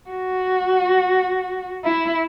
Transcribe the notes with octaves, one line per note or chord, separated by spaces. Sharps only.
F#4
E4